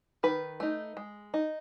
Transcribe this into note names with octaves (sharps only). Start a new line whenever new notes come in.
D#3 B4
A3 D#4
G#3
D#4